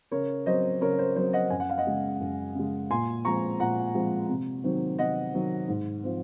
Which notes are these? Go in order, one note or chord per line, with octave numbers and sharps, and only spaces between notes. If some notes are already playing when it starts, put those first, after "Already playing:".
C#3 A#4 C#5
F#3 C4 C5 D#5
C#3 A#4 C#5
C5
F#3 C4 C5
D#5 F#5
F#2 G#5
F#5
F5
D#5 F#5
C#3 G#3
F#2
C#3 G#3
A#2 G#5 C6
F3 G#3 C4 A#5 C#6
A#2 F#5 A#5
F3 G#3 C4
C3
D#3 F#3 C4
C3 D#5 F#5
D#3 F#3 C4
G#2
F3 C4